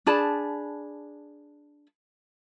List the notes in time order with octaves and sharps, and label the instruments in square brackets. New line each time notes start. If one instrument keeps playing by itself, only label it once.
[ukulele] D4 G#4 A5 B5